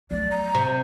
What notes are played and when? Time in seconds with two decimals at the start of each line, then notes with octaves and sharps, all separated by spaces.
0.11 F#3 A3 D5
0.31 A#5
0.55 C3 C5